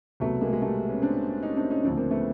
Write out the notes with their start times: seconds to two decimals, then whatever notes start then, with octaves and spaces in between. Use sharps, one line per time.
0.20 C2 B2 F#3 A3 B3
0.41 G#3 A#3
0.53 G#3
0.61 G3 A3
0.89 B3 C#4
1.02 C4 D4
1.43 C#4 D#4
1.57 C4 D4
1.71 C#4 D#4
1.83 D2 C#3 F3 C4 D4
1.97 A#3 C4
2.11 A3 B3